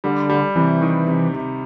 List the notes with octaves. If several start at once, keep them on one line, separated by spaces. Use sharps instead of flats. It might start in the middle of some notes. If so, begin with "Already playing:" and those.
D3 G3
G3
C3 E3
D#3
C3
C3